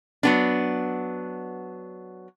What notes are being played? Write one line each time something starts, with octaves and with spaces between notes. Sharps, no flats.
F#3 B3 D4